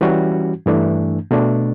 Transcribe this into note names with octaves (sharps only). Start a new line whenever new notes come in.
E3 G3 C#4 F#4
G2 E3 A3 D4
B2 A3 D4